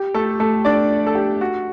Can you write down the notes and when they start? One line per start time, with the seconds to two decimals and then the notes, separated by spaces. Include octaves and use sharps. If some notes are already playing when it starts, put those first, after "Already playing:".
Already playing: G4
0.14 A3 A4
0.40 A3 A4
0.65 D4 D5
1.07 A4
1.15 G4
1.41 F#4